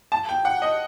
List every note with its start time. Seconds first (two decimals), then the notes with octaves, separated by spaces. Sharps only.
0.12 A5
0.29 G5
0.45 F#5
0.62 D#5